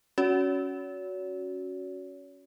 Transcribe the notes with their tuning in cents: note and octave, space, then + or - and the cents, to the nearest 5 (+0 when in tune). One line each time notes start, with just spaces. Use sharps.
C#4 +0 F#4 +0 C#5 +40